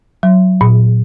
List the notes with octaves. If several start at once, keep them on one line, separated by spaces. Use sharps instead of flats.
F#3
A#2